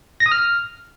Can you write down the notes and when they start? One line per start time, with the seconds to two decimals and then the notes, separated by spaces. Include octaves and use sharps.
0.20 A#6
0.26 D#6
0.32 F6